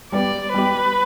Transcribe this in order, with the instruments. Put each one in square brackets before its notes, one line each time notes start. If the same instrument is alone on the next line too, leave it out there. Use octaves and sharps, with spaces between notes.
[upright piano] G3 B3 G4 [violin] D5
[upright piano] G3 B3 G4 [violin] B4